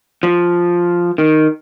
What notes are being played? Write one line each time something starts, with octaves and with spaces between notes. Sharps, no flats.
F3
D#3